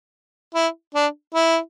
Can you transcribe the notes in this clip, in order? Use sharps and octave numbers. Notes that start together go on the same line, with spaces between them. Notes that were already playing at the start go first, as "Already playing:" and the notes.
E4
D4
E4